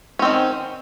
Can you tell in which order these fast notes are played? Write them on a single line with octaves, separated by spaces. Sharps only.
C#4 C4 D#3